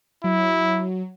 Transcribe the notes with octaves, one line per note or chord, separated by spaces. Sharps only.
F#3 E4